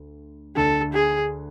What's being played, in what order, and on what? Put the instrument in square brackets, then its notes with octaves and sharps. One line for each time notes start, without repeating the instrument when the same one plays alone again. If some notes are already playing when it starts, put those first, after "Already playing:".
Already playing: [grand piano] D2
[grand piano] D2 D3 A3 [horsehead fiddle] A4
[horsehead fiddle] G#4